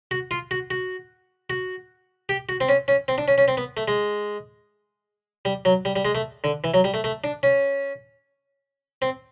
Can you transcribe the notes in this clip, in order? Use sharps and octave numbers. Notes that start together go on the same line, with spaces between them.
F#4
F4
F#4
F#4
F#4
G4
F#4
C4
C#4
C#4
C4
D4
C#4
C#4
C4
B3
A3
G#3
G3
F#3
G3
G3
G#3
A3
D3
E3
F#3
G3
A3
A3
D4
C#4
C4